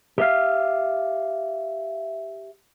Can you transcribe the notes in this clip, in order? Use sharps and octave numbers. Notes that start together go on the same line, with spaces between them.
G4 E5 F5